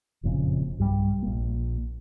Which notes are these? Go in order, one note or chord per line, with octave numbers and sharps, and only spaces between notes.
F#1 F2 A#2 C#3
B1 G2 D#3 G3
A#1 A#3